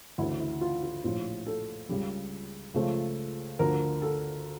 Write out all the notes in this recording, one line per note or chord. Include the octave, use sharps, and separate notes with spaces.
D2 C#3 E3 E4
E4
F4
F4
A#1 A2 F3 F4
A4
C#2 C#3 G3
C#2 C#3 F3 A3
D2 D3 F3 A#4
A4